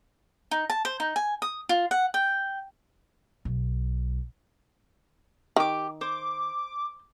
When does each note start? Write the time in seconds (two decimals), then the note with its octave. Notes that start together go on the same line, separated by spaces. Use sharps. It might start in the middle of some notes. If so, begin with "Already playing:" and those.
0.51 D#4
0.70 A5
0.85 C5
1.00 D#4
1.16 G#5
1.42 D#6
1.69 F4
1.91 F#5
2.14 G5
3.45 B1
5.56 D#3 G4 D6
6.01 C5 D6